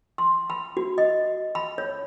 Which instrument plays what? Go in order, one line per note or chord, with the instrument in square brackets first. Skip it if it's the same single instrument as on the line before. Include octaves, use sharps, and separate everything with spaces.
[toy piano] C6
B5
F#4
D#5
B5
C#5